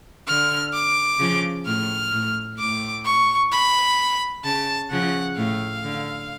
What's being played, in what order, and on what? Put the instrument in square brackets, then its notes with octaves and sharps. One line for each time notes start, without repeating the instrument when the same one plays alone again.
[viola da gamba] D3 [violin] F6
[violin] D6
[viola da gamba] C#3 F3
[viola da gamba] A2 [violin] F6
[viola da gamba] A2
[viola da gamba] A2 [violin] D6
[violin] C#6
B5
[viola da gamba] C#3 [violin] A5
[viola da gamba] C#3 F3 [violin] F#5
[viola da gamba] A2 [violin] F5
[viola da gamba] D3